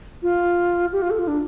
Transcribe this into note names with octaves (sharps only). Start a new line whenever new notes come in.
F4
G4
F4
A4
F4
D4